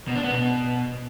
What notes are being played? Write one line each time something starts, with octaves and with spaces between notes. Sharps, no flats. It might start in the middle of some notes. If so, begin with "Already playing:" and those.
B2
D4
B3
B2